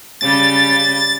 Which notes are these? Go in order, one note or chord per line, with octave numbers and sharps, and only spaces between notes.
C#3 G3 A6